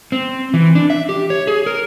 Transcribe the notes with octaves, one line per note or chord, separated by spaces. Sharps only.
C4
E3
D4
E5
G4
C#5
G#4
A#4